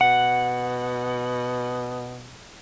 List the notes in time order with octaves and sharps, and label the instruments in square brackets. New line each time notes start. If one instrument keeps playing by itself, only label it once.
[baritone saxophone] B2 [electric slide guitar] F#5